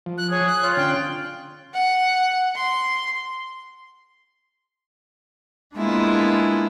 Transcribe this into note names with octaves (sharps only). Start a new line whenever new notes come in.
F3
F#6
G#4 C#5
F#6
F4 C#5
D3 C#4 G5
F#5
C6
G#3 A#3 B3 D4 E4 F4